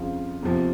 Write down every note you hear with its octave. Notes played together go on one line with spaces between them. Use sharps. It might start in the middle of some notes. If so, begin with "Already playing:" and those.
Already playing: F2 C#3 F3 F4
E2 C3 F3